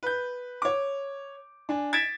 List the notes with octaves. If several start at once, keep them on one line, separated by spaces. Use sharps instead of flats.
B4 G6
C#5 D6
D4 G#5
G#6 A6 B6 D7 E7